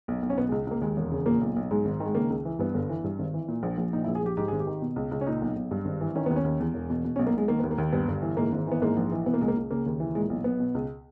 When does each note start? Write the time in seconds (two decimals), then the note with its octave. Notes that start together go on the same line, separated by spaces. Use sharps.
0.08 B1
0.22 B1
0.30 C#4
0.38 B2 B3
0.49 G#3
0.52 C#2
0.67 C#2 A#3
0.81 D#2 G#3
0.97 E1
1.12 C#3
1.26 A#2 A#3
1.41 B1
1.56 B1
1.71 G#2 G#3
1.85 G#1
2.00 D#3
2.06 G#3
2.15 C#3 A#3
2.30 C#2
2.45 E3
2.59 G2 B3
2.74 G1
2.89 E3
3.04 G2
3.19 G#1
3.34 E3
3.48 A#2
3.63 A#1
3.78 A#1
3.93 A#2 D#4
4.05 E4
4.07 A#1
4.15 G#4
4.23 A#1 G4
4.37 G#2 G4
4.48 G#1 G#4
4.60 G4
4.67 D#3
4.82 B2
4.96 C#2
5.11 C#2
5.21 C#4
5.27 A#2 D#4
5.42 B1
5.56 B1
5.71 G2
5.85 G#1
6.01 E3
6.15 D#3 C#4
6.26 D#2 B3
6.36 C#4
6.44 D#2
6.60 E2
6.74 E1
6.90 B2
7.05 B2
7.16 C#4
7.19 B1
7.27 A#3
7.33 B1 G#3
7.48 D#3 A#3
7.59 D#2 B3
7.71 A#3
7.78 D#2
7.93 G2 B3
8.08 G1
8.22 E3
8.37 G#2 A#3
8.53 G#1
8.67 E3 B3
8.82 G#2 A#3
8.97 A#1
9.12 E3
9.26 B2 B3
9.34 A#3
9.41 C#2 G#3
9.48 A#3
9.57 C#2
9.71 C#3 A#3
9.86 D#2
10.00 E3
10.15 A#2 G#3
10.30 B1
10.44 B1 B3
10.60 B2
10.75 C#2